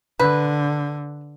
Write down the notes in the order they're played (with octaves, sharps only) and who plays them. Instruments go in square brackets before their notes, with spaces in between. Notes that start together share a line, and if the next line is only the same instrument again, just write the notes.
[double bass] D3 [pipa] B4